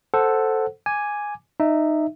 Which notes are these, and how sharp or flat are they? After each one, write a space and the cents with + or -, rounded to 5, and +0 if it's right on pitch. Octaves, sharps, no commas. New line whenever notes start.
A4 +0 C5 +0 F#5 +0
G#5 +0 D6 +0
D#4 -15 E5 +0